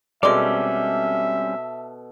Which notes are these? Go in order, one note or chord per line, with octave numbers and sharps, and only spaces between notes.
B2 G3 G#3 C4 C#4 A4 D5 E5